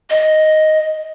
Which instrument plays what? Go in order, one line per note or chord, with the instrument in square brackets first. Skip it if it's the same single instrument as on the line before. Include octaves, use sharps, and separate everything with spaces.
[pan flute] D#5